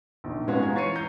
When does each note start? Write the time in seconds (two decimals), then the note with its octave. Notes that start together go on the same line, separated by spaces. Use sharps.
0.24 A#1 D#3
0.47 G#2 G#3 B3 C#4 F4 F#4
0.63 G#3 A#5 G#6
0.75 E3 C#5 A6 C7 C#7 D#7
0.95 A#5 G6